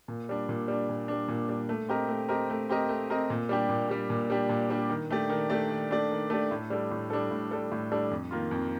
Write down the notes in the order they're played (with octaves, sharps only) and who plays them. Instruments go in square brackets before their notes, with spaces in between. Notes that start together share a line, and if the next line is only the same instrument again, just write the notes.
[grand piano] A#2
G3 D4
A#2
G3 D4
A#2
G3 D4
A#2
G3 D4
A3
C4 G4 A#4 D#5
A3
C4 G4 A#4 D#5
A3
C4 G4 A#4 D#5
A3
C4 G4 A#4 D#5
A#2
G3 D4 G4
A#2
G3 D4 G4
A#2
G3 D4 G4
A#2
G3 D4 G4
D#3
A3 D4 G4 D5
D#3
A3 D4 G4 D5
D#3
A3 D4 G4 D5
D#3
A3 D4 G4 D5
A2
G3 D4 A4
A2
G3 D4 A4
A2
G3 D4 A4
A2
G3 D4 A4
F2
D#3 A#3 F4
F2